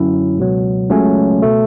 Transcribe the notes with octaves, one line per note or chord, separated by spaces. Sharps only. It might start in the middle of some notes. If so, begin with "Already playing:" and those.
Already playing: F#2 D3 F#3 C#4 E4
C#2 B2 F#3
C#2 C#3 F#3 A3 C#4
B2 A3